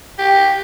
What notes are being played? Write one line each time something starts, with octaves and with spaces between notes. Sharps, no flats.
G4